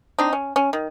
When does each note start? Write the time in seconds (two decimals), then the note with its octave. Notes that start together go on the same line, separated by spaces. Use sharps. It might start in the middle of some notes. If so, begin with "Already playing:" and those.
0.19 C4 D4 D#4
0.33 C#4
0.56 C#4
0.73 D#3